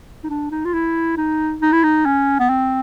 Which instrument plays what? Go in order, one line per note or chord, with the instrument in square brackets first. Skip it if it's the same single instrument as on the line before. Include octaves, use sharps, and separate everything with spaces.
[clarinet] D#4
D4
D#4
F4
E4
D#4
D#4
E4
D#4
C#4
B3
C4